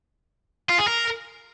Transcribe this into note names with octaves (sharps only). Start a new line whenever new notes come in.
F4
G#4
A#4